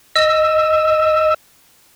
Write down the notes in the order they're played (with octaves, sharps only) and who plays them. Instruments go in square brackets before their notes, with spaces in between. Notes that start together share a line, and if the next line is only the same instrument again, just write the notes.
[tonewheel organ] D#5 E6